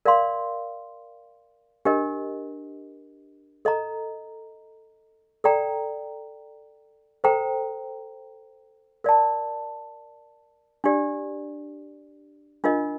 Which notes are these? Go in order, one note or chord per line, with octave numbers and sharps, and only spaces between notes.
A#4 D5 F5 C6
D4 G4 A#4 D#5
A4 D#5 A#5
A4 D5 G5 A#5
A4 C5 G5 A#5
A#4 D5 A5
D4 G4 D5
D4 F4 A#4 D#5